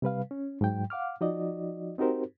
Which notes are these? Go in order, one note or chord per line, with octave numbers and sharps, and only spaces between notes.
C3 G3 B4 F5
C#4
G#2 F#3 G5
F5 F#5 D6 F6
F3 D#4 F#4 D5 D#5
C4 D#4 F#4 G4 A#4 C5